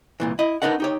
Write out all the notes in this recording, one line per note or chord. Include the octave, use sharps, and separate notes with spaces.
C2 A#2 E3
E4 D#5
B3 D4 D#4 A#4 E5 F#5
D#4 G4 C#5